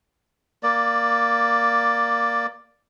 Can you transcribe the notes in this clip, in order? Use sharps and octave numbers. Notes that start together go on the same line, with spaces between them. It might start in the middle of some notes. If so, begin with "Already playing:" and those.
A#3 D5